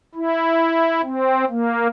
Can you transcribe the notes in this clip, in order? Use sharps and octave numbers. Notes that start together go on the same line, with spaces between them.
E4
C4
A#3